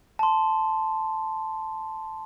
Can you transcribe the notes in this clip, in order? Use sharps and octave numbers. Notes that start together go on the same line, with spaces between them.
A5 C6